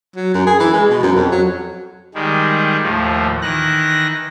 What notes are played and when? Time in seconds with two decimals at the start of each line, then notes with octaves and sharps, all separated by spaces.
0.16 F#3
0.34 F#2
0.47 G#4
0.60 E3
0.73 G#3
0.90 B2
1.03 F#2
1.16 F2
1.32 F#3
2.15 D#3 G3 G#3
2.82 D#2 A2 F3
3.42 D#3 E3 F#6 A#6